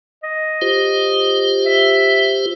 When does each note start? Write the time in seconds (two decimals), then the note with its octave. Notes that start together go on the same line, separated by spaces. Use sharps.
0.24 D#5
0.62 F4 G4 C5
1.66 E5